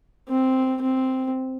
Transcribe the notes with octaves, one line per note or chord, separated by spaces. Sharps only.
C4
C4